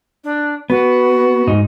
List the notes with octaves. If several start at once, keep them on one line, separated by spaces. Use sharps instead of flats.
D4
B3 F#4
G#2 D#4